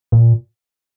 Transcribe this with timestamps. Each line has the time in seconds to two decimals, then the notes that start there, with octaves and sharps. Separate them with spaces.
0.12 A#2